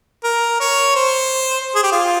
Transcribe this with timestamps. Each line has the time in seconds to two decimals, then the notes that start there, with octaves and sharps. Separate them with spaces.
0.24 A#4
0.60 C#5
0.95 C5
1.75 G#4
1.83 G4
1.93 F4